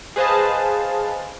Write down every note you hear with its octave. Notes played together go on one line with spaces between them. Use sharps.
G#4 B4 C5 D#5 F5 A5